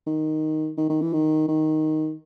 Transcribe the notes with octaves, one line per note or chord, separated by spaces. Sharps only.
D#3
D#3
D#3
E3
D#3
D#3